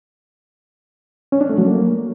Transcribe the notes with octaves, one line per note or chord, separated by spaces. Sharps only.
C#4
D4
A3
F#3
A#3